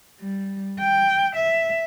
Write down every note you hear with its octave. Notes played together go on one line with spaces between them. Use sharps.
G3
G5
E5